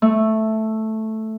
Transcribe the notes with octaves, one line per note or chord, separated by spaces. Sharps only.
A3